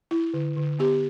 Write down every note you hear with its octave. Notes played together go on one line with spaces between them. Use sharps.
E4
D3
D3
B3 G4